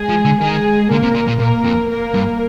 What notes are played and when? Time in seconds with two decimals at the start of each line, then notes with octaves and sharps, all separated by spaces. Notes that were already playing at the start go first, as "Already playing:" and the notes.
Already playing: G#3 G#4
0.09 F3
0.25 D3
0.41 D#3 G#3 G#4
0.91 D3 A#3 A#4
1.03 C3
1.15 A#2
1.28 A#2
1.40 A#2 A#3 A#4
1.64 F2
1.89 A#3 A#4
2.14 G2